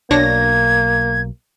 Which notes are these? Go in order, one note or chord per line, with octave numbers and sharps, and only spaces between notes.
B1 A#3 D4 C#5 G#6 A#6